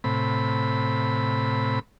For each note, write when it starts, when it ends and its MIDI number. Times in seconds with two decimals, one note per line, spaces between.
0.04 1.79 45
0.04 1.79 48
0.04 1.79 83